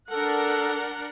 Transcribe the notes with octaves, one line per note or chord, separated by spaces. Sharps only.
D4 A4 A#4 F#5